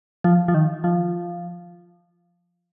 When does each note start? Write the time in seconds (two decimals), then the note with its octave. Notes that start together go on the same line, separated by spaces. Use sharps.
0.24 F3
0.48 F3
0.54 D#3
0.84 F3